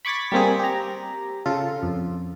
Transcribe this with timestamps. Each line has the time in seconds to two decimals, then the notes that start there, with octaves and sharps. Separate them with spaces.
0.05 B5 C#6 D6 G#6 A6 B6
0.32 G3 A#3 C4 G#4
0.59 G4 A#5
1.46 C#3 F4 A4
1.83 F2